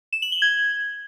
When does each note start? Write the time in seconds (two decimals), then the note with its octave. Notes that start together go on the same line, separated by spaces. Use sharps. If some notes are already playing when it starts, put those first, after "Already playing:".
0.13 E7
0.22 F#7
0.32 G7
0.42 G#6